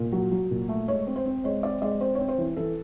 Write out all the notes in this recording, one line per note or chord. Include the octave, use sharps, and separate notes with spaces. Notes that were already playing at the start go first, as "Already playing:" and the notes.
Already playing: A#2
F#3
F#3
A#2
A3
G#3 C#5
C4
C5
C4
G#3 C#5
C4 D5
G#3 D5
C4 C5
C4 C#5
C5
E3
E3 A4